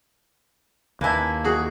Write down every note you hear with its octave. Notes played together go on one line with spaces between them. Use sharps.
D#2 A#3 E4 B4 G#5 A5
F#4 G#4